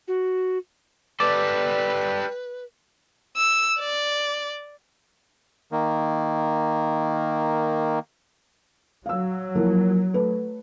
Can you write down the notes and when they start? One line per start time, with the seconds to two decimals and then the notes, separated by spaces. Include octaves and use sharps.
0.08 F#4
1.20 G3 A4 B4 D5
3.37 E6
3.79 D5
5.72 D#3 A#3
9.06 F#3 F5 E6
9.55 F3 A#3 E4
10.14 A3 B4